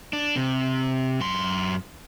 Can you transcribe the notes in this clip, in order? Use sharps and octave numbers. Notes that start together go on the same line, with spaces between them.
D4
C3
F#2 C6